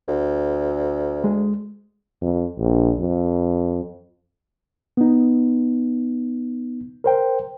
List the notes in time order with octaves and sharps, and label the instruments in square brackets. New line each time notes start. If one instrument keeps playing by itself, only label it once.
[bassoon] D2
[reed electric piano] G#3
[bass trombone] F2
A#1
F2
[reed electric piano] B3 D#4
A#4 C5 G5